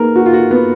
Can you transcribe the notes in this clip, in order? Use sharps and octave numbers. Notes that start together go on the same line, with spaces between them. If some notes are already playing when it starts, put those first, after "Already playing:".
Already playing: A#3 D#4 G#4 A#4 B4
F#4
F4
F#4
B3